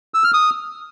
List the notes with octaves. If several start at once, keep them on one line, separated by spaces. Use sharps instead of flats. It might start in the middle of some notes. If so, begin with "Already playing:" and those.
E6
F6
D#6